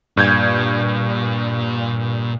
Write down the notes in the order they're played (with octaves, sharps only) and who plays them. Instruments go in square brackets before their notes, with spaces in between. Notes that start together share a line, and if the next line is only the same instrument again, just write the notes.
[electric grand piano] G2 G6 G#6 [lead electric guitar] A#2